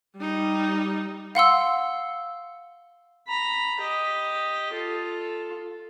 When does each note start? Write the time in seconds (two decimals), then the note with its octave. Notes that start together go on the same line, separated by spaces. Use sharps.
0.17 G3 D#4
1.35 F5 F#5 C6 E6
3.28 A#5 B5
3.80 G4 D#5
4.72 F4 A4